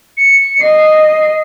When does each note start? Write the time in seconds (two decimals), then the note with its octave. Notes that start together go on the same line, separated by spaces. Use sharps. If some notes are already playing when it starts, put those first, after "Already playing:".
0.17 C#7
0.60 D#5 C7